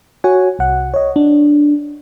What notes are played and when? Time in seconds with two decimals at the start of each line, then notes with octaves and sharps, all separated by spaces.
0.24 F#4 C#5 F#5 G#5
0.59 C2 F#5
0.94 C#5 D#5
1.16 D4